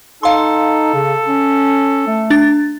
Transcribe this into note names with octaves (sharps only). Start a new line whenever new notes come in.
D#4 A4 F5 C6
C#3
C#4
A3
D4 A6